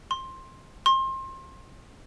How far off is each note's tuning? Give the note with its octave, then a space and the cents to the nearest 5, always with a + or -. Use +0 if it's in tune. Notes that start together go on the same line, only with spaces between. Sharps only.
C6 +15
C6 +30